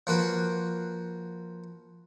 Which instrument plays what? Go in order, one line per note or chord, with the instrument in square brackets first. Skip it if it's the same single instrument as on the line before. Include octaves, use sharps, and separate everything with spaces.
[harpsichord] F3 A#3 F#4 B4